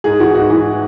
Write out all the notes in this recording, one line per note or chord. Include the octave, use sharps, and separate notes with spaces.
G#2 G#4
E3 F#4
G#2 F#4
E3